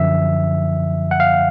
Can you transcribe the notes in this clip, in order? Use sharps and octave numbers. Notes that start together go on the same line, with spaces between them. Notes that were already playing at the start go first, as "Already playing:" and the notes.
Already playing: F#2 D3 F3 E5
F#5
F5